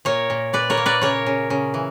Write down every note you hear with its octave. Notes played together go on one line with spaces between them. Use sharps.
A#2 A#4 C#5
A#2
A#2 B4 D5
A#4 C#5
A#3
B4 D5
C#3 A#4 C#5
C#3
C#3
E3